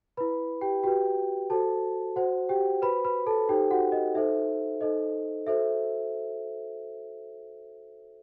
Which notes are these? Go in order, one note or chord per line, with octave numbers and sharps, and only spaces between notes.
B4 B5
E4
G4 G5
F#4 G4 B4 G5
F#4 A4 C5 A5
F#4 C5 F#5
G4 G5
F#4 B4 C5 B5
B4 B5
A4 A5
D#4 G4 A4 C5 G5
F#4 F#5
D#5
D#4 A4 C5 E5
D#4 A4 C5 D#5
F#4 A4 C5 E5